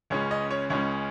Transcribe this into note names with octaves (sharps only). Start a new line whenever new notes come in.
C#2 C#3 G#3 C#4 C#5
D#5
C#5
C#2 C#3 G#3 C#4 C#5